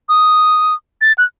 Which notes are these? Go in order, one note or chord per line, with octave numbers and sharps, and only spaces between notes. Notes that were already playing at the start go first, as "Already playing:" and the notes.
D#6
A6
F#6